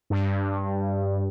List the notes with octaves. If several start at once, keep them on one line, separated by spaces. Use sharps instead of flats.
G2